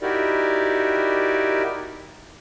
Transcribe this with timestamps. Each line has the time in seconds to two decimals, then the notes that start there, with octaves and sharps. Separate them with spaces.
0.01 D#4 E4 F#4 G4 A#4 D5